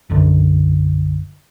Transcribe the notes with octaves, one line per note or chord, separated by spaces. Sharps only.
F#1 B1 F#2 D3